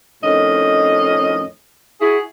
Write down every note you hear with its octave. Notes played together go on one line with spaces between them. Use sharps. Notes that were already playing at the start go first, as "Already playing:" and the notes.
F2 A2 D#3 C#4 D#5
E4 F#4 G#4